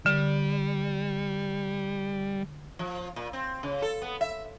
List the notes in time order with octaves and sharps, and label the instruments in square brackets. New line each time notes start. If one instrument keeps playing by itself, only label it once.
[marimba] D3 [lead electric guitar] G3
[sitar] F3
A#2
C4
C#3
A4
B3
E5